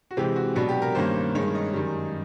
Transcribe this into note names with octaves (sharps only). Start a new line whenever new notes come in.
F#4
C3 E3 G#3 C4 G4
F#4
B2 F#3 B3 D4 F#4
G4
A#4
G2 D#3 G3 A#3 C#4 C5
G2 D#3 G#3 C#4 C#5
D#5
F#2 D#3 G3